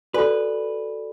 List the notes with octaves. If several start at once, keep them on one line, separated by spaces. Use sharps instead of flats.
F#4 A4 B4 D5 G#5